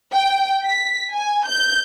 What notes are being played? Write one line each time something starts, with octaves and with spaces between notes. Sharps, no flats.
G5
B6
G#5
G6